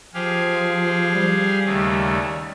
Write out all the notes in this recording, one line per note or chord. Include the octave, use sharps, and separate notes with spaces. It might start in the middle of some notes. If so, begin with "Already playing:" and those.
F3 G4 G#4 F5
G3
D#2 C#3 A3